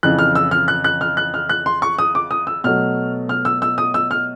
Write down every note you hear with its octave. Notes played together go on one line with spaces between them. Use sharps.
F2 C#3 E3 F#6
F6
E6
F6
F#6
F#6
F6
F#6
F6
F#6
C6
C#6
D#6
D6
D#6
E6
B2 F#3 A3 F6
F6
E6
E6
D#6
E6
F6